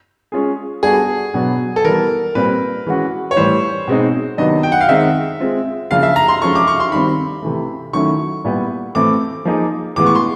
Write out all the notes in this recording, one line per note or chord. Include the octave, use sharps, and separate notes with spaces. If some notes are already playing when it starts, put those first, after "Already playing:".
G#3 C#4 F4 G#4
G3 B3 D4 F#4 G#4 A4
B2 F#3 B3 D4
A4
E3 G3 B3 A#4
A#2 G3 C4 B4
E3 G#3 C#4 F#4
C#5
A2 E3 G3 C5
B2 G#3 C4 D#4
C3 D#3 F#3 B3 D4 D#5
G5
F#5
F5
D#3 G#3 C4 D#4 E5
G#3 C4 F4
C#3 F3 A#3 D4 F4 F5
E5
A#5
C6
F3 G#3 C#4 F4 A4 C#6
D6
C#6
C6
D#3 G3 C4 B5
C3 E3 A3
D#3 F#3 A3 C#4 E4 C#6
A#2 G3 B3 E4 G4
A2 E3 A3 C4 E4 D6
F3 A#3 D#4 G#4
A2 E3 G#3 B3 D6
C#6
C6